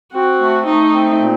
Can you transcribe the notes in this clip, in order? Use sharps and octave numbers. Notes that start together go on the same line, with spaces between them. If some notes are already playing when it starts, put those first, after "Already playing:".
C4 F#4
A3
A3 D#4
C4
A#2